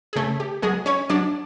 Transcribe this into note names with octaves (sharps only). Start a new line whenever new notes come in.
G#4
C#3 A3 A4
G4
F#3 G#3 G#4
C#4 C#5
F#3 D4 D5